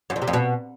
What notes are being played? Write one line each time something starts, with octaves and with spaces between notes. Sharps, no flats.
F#2
F2
C3
F2
B2